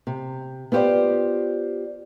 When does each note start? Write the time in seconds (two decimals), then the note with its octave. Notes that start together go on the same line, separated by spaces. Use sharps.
0.07 C3
0.72 B3 F4 G4 C5 D5